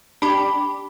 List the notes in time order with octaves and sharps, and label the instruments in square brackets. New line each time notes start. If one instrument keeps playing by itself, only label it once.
[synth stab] D4 G4 [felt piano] B5